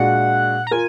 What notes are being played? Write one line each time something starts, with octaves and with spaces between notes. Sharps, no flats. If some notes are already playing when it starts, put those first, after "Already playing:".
Already playing: A#2 G#3 D4 F#4 F#5
A#5
F4 A#4 G#5